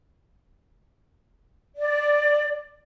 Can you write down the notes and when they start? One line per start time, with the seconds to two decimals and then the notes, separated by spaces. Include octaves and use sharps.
1.76 D5